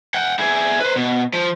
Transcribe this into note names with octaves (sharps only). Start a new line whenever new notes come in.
F#5 G5
E4 G#4
B4 C5
B2
F3